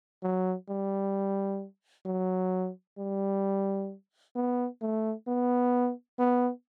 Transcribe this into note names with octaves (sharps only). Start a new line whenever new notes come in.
F#3
G3
F#3
G3
B3
A3
B3
B3